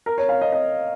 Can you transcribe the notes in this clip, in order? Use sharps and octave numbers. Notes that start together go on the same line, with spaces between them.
A#4
C#5
F5
D#5
D#5